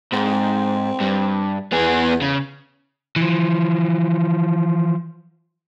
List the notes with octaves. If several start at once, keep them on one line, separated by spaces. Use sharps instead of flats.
G#2 C4
G2
E2 B3 G#4
C#3
E3 F3